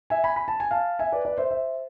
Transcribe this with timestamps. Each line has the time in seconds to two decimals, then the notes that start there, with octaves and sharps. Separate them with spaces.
0.10 E5 G#5
0.24 G#5 B5
0.36 B5
0.48 A5
0.60 G#5
0.71 F5 A5
0.99 E5 G#5
1.12 B4 D5
1.25 B4 D5
1.38 C5 E5
1.51 C5 E5